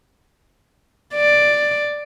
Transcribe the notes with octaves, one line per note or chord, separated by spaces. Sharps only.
D5